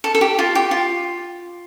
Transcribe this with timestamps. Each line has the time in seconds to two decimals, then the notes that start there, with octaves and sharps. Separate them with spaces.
0.04 A4
0.15 A4
0.21 G4
0.39 F4
0.55 G4
0.71 F4